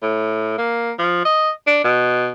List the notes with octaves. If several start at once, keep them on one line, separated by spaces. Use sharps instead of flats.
A2
A#3
F3
D#5
D4
B2